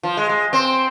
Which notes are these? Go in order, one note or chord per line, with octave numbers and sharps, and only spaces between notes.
F3
G#3
G#3
C4